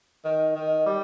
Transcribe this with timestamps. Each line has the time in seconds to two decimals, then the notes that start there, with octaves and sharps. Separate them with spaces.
0.24 D#3
0.55 D#3
0.86 G3